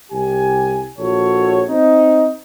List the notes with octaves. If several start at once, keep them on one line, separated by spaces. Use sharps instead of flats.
C2 G4 G#5
A#1 F#4 A4 C#5
C4 D#4